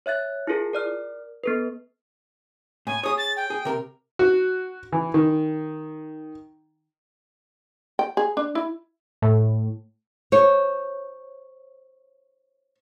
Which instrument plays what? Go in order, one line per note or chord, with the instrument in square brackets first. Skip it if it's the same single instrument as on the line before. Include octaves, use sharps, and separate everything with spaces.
[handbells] C#5 E5 F#6 A6
E4 F4 G#4 A#4
A#4 D5 F6
B3 A4 B4
[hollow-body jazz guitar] A2 [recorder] G#5
[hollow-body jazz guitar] G#4 C#5 [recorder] D#6
[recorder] A6
G5
[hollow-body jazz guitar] G#4
C3 A#4
[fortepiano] F#4
E3
D#3
[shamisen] G5
G#4
D4
E4
[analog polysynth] A2
[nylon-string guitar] C5 C#5